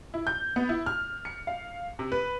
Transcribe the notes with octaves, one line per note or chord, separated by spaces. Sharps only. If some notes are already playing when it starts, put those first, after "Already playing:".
E4
G6
B3
E4
F6
C#7
F5
C3
B4